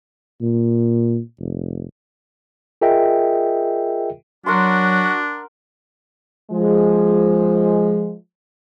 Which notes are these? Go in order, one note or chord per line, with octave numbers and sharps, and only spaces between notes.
A#2
F1
F4 G#4 A#4 D#5 E5 G5
F#3 D4 F#4 A#4 F#5 C6
F3 G#3